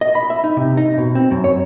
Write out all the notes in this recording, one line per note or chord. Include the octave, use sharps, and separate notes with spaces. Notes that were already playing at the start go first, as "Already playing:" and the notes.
D#5
B5
E5
D#4
C3
D#4
B2
C4
F#2
C#5